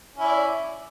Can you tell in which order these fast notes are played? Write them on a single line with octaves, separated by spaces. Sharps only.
C#4 E4 D5